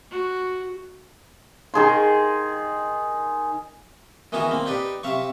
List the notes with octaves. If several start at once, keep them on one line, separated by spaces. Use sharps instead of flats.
F#4
D#3 G#4 C6
D#3 E3 B3 F#4 G#4 A#4
A#3 C4
D4 D#4 G4 B4
C3 E5 F5 C#6